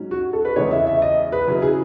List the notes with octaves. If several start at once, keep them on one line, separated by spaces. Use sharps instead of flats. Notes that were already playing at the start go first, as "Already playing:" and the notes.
Already playing: G#2 F#3 C#4
F#4
A4
B4
E2 C#3 G#3 C#5
E5
E5
D#5
B4
C#3 F#3 C#4 E4
G#4